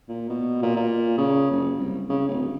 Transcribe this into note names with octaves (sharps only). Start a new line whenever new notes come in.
A#2
B2
A#2
A#2
C#3
F#1
C2
C#3
D1